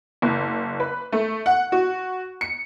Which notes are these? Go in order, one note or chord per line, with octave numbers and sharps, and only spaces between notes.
F#1
B4
A3
F#5
F#4
C#7